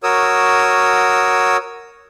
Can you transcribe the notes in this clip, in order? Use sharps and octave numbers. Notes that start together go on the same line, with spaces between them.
F#4 A#4 C#5 D#6 E6